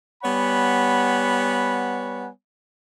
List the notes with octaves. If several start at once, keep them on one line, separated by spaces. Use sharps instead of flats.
G3 B3 C#5 F#5 G#5 B5